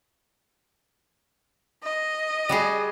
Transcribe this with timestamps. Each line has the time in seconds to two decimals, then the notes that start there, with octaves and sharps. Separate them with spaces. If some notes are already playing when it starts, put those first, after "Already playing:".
1.83 D#5
2.49 G3 F#4 G#4